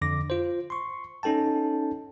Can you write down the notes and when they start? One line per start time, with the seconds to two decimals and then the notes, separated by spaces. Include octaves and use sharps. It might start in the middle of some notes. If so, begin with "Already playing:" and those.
0.02 F2 D3 D6 A#6
0.30 F4 C5
0.70 C6 C#6
1.23 C#4 D#4 A4 G5 A5